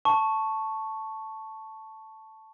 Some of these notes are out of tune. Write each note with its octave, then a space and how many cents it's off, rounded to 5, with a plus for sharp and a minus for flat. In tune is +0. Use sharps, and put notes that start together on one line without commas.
A5 +0 C#6 +0